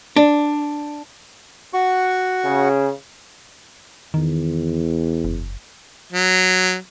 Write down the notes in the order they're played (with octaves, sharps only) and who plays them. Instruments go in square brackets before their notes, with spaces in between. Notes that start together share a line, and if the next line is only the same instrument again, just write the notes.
[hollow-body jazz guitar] D4
[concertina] F#4 F#5 C#6
[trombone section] C#3
[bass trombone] E2 [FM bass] D#3
[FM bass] F#1
[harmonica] F#3